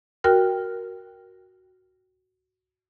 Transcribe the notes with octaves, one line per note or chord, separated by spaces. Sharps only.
F#4 A#4 G5 F6